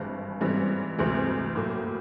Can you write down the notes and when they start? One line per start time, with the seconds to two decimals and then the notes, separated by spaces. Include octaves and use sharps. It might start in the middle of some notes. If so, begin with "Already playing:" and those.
Already playing: G#1 G2 E3 G#3
0.41 G#2 E3 G3 C4
0.98 D2 C3 E3 G#3 C4
1.55 A2 F#3 A#3